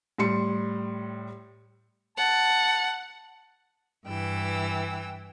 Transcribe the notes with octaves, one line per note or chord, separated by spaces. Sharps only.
A2 G3 C6 C#7
F#5 A5
G2 E3 G5 E6